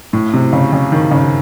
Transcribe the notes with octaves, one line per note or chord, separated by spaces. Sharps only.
A2
C3
C#3
C#3
D#3
C#3